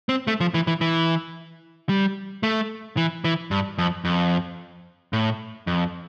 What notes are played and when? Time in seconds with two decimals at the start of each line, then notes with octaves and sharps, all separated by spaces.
0.09 C4
0.27 A3
0.40 F3
0.54 E3
0.67 E3
0.81 E3
1.89 G3
2.43 A3
2.97 E3
3.25 E3
3.51 G2
3.78 F2
4.05 F2
5.13 A2
5.67 F2